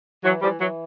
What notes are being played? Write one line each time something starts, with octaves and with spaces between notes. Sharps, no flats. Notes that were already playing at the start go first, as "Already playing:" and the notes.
E3 F#3
E3 F3 G3
E3 F#3